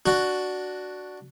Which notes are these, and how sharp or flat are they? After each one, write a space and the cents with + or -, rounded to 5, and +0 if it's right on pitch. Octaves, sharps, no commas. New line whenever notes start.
D4 +0 F#4 +0